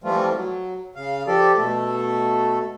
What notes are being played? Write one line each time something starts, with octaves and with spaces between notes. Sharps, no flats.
E3 F3 G3 A3 C4 F4
F#3
C#3 F5
F3 G4 A4 D5
B2 A3 A4